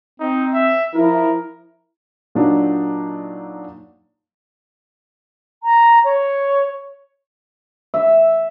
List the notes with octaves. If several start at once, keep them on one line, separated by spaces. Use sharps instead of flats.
C4 D#4
E5
F3 E4 A#4
A#2 F#3 D4 D#4
A#5
C#5
E5